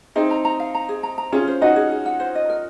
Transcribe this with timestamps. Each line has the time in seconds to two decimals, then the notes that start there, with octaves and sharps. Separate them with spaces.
0.16 C4 D#4 G#4
0.31 A#5
0.45 A#5
0.60 F5
0.75 A#5
0.89 G#4
1.03 A#5
1.18 A#5
1.32 C#4 F4 G#4
1.48 C5
1.61 D#4 F#4 D#5
1.76 G#4
1.91 G#4
2.06 F#5
2.20 C5
2.35 D#5
2.50 A#4